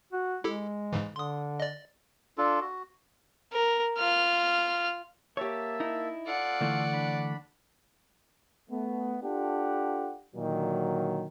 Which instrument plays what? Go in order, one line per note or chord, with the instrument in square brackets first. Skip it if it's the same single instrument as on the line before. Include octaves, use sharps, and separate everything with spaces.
[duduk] F#4
[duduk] G#3 [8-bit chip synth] E4 G4 A4
[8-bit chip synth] G#2 C#3 E3
[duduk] D3 [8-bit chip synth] C6 D#6
[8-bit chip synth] D5 D#5
[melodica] D4 F4 A4
F#4
[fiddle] A#4
F4 F6
[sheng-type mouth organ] A#3 E5 A5 [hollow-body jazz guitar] G4 C#5
[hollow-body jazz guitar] D#4 E4
[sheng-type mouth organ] F4 A4 F5 [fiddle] D5 F#5
[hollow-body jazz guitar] D3 E3 A3
[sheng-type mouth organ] D4 B5
[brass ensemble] A3 B3
D4 F4 G4 A4 F#5
A#2 D3 D#3 F#3